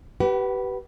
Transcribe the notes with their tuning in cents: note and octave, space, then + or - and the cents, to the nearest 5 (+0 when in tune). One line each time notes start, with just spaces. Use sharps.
G4 -30 B4 -5 F#5 +40